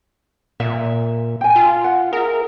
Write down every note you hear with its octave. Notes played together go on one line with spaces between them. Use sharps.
A#2 E5
G5 G#5
F4
F#5
G#4 A#4 E5